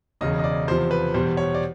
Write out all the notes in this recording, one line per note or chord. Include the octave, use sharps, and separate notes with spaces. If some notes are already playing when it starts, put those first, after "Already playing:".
E1 E2 C#3 D#5
D#5
D5
E2 C3 F3 C5
B4
E2 B2 G3 C5
C#5
D5